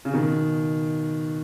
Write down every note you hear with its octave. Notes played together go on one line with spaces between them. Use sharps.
C#3
B2 D#3